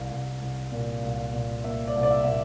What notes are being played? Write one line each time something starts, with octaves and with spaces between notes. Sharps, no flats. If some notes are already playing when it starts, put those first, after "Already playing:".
Already playing: C2 F5
C2
C2
A#2
C2
A#2
A#3 E5
D5
C2
D5
E5
A#2 E5